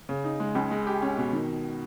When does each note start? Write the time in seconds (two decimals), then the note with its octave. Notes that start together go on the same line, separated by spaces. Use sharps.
0.09 C#3
0.24 D#4
0.40 G#3
0.55 C#2
0.71 G#3
0.87 G4
1.02 C#4
1.18 B2
1.33 D#3